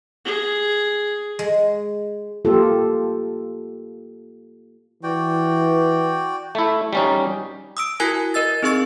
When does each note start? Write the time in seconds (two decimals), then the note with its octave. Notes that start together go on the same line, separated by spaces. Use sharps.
0.25 G#4
1.39 G#3
2.45 A#3 F4 G4 A4
5.03 E3 F#4 D5 G5
6.55 A3 E4
6.93 G3 C#4 D#4
7.77 D#6 E6 D7
8.00 E4 F#4 A#4 G#5 F#6 G#6
8.34 A#4 D#5 E6 A6
8.63 C4 D#4 G#4 D#5 C#6 E6